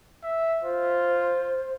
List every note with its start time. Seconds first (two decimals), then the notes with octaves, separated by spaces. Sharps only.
0.24 E5
0.63 F4 C5